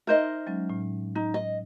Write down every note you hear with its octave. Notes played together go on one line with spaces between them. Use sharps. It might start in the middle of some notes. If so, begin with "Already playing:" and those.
D#4 A#4 C5 D#5 E5
F#3 G#3 C#4
A2
D#4
D#5